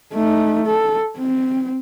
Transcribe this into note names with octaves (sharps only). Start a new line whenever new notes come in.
A3 D#4
A4
C4